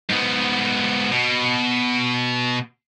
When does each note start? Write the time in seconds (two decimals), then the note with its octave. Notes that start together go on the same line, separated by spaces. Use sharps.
0.10 G#2 B3
1.12 B2